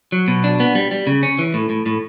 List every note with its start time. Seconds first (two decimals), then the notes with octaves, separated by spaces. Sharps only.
0.12 F#3
0.28 B2
0.44 D4
0.60 B3
0.75 G3
0.91 G3
1.07 C#3
1.23 C#4
1.39 E3
1.54 A2
1.70 A2
1.86 A2